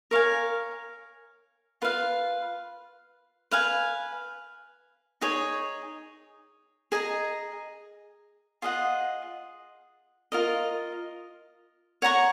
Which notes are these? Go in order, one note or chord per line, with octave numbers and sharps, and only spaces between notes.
A#4 C#5 F5 G#5
F4 B4 F5
B4 F5 G#5
D#4 G#4 C#5
G#4 D#5 A#5
F4 G#4 D#5 F#5
F4 A#4 D#5
C#5 F#5 A#5 C#6